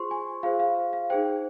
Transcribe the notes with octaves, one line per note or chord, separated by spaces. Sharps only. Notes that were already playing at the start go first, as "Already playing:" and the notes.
Already playing: F4 G#4 C5 C6 C#6
G#5
F4 G#4 C5 F5
F5
F5
D#4 G#4 C5 G5